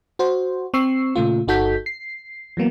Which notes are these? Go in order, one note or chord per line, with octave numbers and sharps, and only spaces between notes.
F#4 C5
C4 C#6 E6 C7
A#2 C#3 A3 F4
G1 D#4 F#4 A4 G6 B6
C7
E3 F#3 A#3 B3